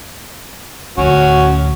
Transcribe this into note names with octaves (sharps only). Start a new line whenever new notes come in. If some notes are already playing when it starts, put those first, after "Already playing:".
D2 A2 C#4 F#4